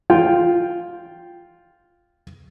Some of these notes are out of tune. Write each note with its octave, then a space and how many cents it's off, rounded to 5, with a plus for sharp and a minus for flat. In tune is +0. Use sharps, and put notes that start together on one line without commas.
F4 +0 G5 +0